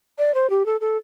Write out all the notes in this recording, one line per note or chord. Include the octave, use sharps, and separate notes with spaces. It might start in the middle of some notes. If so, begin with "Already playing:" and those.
D5
C5
G4
A4
A4